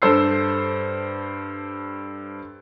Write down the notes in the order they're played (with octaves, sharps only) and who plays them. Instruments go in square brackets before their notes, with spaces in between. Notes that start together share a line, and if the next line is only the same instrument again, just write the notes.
[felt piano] G2 A4 C5 E6 C7